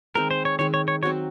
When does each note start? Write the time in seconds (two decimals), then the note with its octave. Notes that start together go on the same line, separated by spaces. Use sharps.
0.15 D#3 G#3 C4 A#4
0.31 C5
0.45 C#5
0.59 D#3 G#3 C4 C#5
0.74 C#5
0.88 C#5
1.03 F#3 C4 F#4 C#5